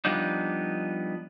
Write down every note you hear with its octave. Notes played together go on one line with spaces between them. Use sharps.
F3 G3 B3 D4 D#4